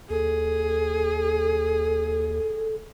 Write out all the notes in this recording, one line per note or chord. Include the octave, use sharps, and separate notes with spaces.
D#2 G#4 A4